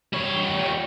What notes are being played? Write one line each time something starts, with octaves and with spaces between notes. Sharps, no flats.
G3 C#5